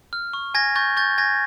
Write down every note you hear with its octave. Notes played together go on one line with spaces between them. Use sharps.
F6
C#6
G#5 G#6 A#6
C#6 G6 A6
C#6 G6 A6
G#5 G#6 A#6